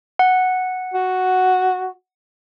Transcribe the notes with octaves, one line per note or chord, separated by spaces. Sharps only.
F#5
F#4